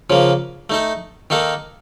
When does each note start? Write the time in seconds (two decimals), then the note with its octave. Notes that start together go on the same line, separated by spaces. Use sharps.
0.10 C#3 F3 A#3
0.70 A3 D#4 A4
1.30 D#3 A#3 D#4 A4